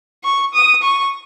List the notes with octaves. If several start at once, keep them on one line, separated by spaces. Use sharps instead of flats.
C#6
D#6
C#6